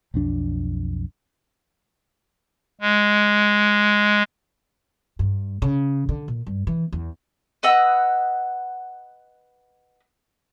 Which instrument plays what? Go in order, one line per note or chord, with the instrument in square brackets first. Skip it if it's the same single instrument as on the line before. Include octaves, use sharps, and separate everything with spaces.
[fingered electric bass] B1 F2 D4
[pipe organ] G#3
[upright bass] G2
C#3
D3
A#2
G2
E3
E2
[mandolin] B4 D#5 F#5 E6